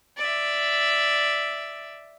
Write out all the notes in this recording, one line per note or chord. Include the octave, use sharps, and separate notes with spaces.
D5 E5